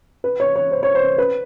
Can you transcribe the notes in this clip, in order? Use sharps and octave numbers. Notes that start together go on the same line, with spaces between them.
B4
C#5
C#5
C5
C#5
C5
B4